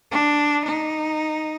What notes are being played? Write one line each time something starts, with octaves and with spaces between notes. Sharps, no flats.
D4
D#4